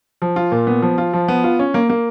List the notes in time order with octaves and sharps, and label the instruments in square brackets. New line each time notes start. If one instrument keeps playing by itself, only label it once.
[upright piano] F3
F4
A#2
B3
F3
F4
F3
B3
F4
C#4
A#3
A#3